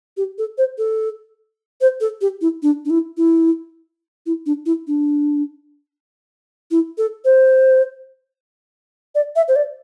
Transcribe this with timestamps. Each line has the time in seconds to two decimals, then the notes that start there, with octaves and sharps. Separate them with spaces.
0.17 G4
0.38 A4
0.58 C5
0.78 A4
1.81 C5
2.01 A4
2.21 G4
2.41 E4
2.63 D4
2.85 D4
2.90 E4
3.17 E4
4.26 E4
4.46 D4
4.66 E4
4.87 D4
6.71 E4
6.98 A4
7.25 C5
9.15 D5
9.36 E5
9.48 C5
9.56 D5